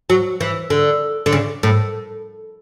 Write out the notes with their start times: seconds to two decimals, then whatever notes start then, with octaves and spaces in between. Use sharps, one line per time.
0.10 F#3
0.41 E3
0.70 D3
1.26 D3
1.33 C#3
1.63 A2